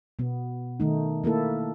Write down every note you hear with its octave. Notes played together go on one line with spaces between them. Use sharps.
B2 B3
D#3 A3 D#4
A3 A#3 E4 A4